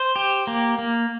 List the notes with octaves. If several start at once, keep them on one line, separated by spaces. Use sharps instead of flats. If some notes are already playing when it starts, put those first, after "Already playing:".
Already playing: C5
G4
A#3
A#3